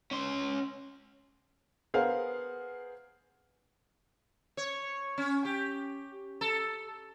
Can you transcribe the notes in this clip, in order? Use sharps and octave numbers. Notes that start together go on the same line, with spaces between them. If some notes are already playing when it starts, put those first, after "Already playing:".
C#4 C6
B3 G#4 A#4 C5 F5 F#5
C#5
C#4
G4
A4